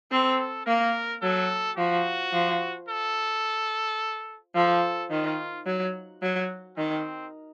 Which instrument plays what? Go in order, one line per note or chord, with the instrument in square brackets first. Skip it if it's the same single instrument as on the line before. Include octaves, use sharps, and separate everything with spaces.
[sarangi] C4 [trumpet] A4
[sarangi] A#3 [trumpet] A#4
[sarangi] F#3 [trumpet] A4
[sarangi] F3 [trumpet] F#4
[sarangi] F3
[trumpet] A4
[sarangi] F3 [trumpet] A4
[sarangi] D#3 [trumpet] F4
[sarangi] F#3
F#3
[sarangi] D#3 [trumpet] C4